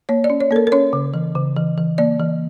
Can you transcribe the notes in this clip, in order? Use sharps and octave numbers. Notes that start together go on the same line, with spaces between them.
A#3 C#5
D5
C#4
C#5
A#3 A4
A#4
A#4
C#4 C#5
C#3
E3
C#3
E3
E3
A#3 D5
E3